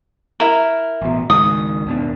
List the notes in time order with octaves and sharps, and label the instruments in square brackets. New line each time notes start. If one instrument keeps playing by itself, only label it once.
[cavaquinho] E4 A#4
[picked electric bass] A1 B2
[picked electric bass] C#2 G#2 D#3 [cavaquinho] D#6
[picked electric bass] D#2 B2 D4